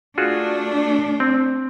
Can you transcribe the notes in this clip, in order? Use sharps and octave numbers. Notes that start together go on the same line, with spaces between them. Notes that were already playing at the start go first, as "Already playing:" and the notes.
A3 D4 F4 F#4 G#4
C4